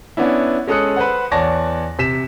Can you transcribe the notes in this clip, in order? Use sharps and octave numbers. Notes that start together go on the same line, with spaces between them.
B3 C#4 D4 E4
G#3 C#4 A4 D#6 F#6 C#7
B4 C5 F#5
E2 C#5 D5 A5 A#6
C3 B6 E7